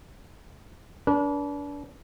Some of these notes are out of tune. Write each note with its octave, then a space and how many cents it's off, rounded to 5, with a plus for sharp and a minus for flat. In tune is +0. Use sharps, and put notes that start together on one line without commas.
D4 -35 B4 -45